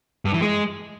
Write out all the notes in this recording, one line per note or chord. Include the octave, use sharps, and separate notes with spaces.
G2
E3
G#3